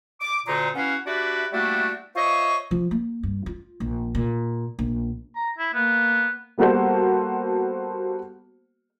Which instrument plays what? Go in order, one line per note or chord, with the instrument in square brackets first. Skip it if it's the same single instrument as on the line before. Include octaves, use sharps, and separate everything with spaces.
[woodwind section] D6
D2 A#2 D3 D#4 G#4 A#5
B3 C#4 E4 F#4 F5
D4 F#4 G4 B4 D5 E5
G3 A3 A#3 D4 E4 F#4
F4 C5 C#5 D#5 E5 C#6
[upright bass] F3
A#3
G2
F4
A#1
A#2
A#1
[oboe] A#5
E4
[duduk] A#3 [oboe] B3
[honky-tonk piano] G3 A#3 B3 F#4 A4 C5